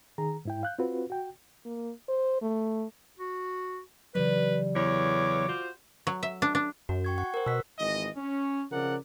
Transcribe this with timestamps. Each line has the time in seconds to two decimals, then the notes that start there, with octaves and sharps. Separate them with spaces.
0.18 D#3 G#4 A#5
0.45 G#2 E4 G5
0.63 F5 F#6 G6
0.79 C4 F4 F#4 B4
1.10 F#4 G5
1.65 A#3
2.09 C5
2.42 A3
3.19 F#4
4.15 C#3 E3 F#3 G3 B4
4.76 E2 C#5 D6
5.48 F4 F#4 C5
6.07 F#3
6.23 E5
6.42 D4
6.55 D4
6.89 F#2 F#4
7.05 G5 C#6 G#6
7.18 F#5 C#6
7.34 A#4 C5
7.46 B2 E6 F#6 B6
7.79 G#1 G#2 E3 D#5
8.17 C#4
8.72 C#3 F3 A#4 D5 F#5